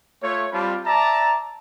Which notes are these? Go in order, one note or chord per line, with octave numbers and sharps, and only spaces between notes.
A3 F4 C#5
G3 C4 F4 A5 B5
D5 E5 A5 A#5